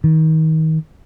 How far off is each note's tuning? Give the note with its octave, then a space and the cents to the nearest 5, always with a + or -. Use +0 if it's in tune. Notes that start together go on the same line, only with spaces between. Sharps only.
D#3 +30